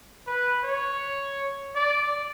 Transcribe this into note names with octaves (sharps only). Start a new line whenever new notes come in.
B4
C#5
D5